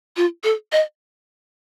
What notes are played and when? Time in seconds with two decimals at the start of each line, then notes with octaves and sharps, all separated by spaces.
0.17 F4
0.44 A4
0.72 D#5